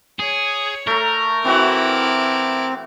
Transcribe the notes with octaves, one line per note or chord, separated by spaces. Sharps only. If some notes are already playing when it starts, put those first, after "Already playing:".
G#4 C#5
A3 A#4 A#5
E3 C4 E4 F#4 F#5 D6